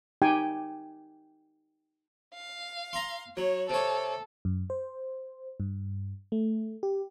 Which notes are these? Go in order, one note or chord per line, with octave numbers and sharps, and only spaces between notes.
D#4 G4 G5 G#5
F5
A#5 C6
F#3 C#5
C3 A4 C#5
F#2
C5
G2
A3
G4